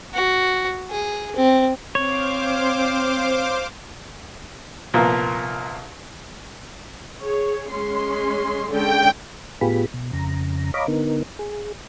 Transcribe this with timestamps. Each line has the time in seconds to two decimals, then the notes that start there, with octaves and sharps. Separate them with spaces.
0.14 F#4
0.90 G#4
1.35 C4
1.95 C4 C5 C#5 F5 D6
4.94 C2 A#2 F3 A#3 B3
7.22 G#4 C#5
7.70 G#3 C#4 C6
8.71 D3 G#3 C#4 G5
9.61 A2 B3 F4 G4 G#4 B5
9.94 B2
10.13 F2 C#3 A#5
10.74 C#5 D#5 F5 A#5 B5 D6
10.88 D3 B3 D#4 A#4
11.39 G#4